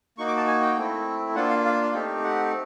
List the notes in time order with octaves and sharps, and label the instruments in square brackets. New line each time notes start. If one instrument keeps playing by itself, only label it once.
[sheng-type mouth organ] A#3 D#4 F#4 C#6
D6
A5
G#5
G5
A3 C4 E4
A#3 D4 F4 F#5
F5
F5
A3 C4 D#4 G4
F#5